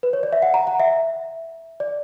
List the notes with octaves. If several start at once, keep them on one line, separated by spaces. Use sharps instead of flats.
B4
C#5
D5
E5
F#5
A#5
F#5
E5
D5